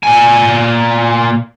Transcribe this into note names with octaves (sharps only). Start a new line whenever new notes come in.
A#2 G#5